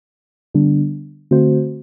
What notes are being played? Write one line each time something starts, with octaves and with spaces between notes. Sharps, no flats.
D3 G3 B3 D4
D3 A3 C4 F#4 C5